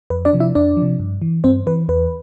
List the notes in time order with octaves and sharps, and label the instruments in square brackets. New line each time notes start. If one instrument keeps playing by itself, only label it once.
[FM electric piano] F2 B4
D4 D5
C3 F3
E4 E5
F2 D4 D5
F3
C3
G2
E3
G2 C4 C5
E3 B4
E2 B4